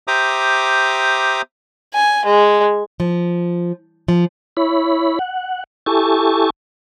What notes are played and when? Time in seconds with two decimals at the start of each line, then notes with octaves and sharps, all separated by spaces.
0.08 G4 C5 E5 A#5 D6 D#6
1.94 G#5
2.25 G#3
3.00 F3
4.08 F3
4.57 E4 C#5 B5
5.19 F#5
5.86 E4 G4 A4 G#5 A5 C#6